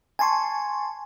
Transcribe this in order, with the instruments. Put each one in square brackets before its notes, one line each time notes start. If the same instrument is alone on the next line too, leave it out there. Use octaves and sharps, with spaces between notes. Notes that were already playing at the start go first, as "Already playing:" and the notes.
[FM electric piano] G#5 A5 C6 C#6